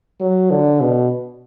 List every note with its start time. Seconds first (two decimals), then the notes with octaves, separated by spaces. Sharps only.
0.20 F#3
0.51 D3
0.81 B2